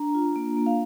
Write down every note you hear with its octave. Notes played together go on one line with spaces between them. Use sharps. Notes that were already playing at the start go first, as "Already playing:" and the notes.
Already playing: D4 A#5
F4
A#3
A#3
F5